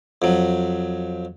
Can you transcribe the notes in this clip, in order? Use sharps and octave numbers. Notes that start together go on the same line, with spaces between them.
F2 F#3